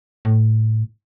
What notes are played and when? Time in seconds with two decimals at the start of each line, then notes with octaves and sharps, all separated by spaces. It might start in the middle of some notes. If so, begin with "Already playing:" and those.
0.25 A2